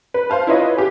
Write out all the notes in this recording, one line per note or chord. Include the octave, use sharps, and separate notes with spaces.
B4
C5 F5 A5
E4 F4 B4 C#5 D#5
G4 G#4 B4